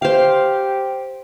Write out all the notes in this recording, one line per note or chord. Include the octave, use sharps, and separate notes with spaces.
G4 C5 F5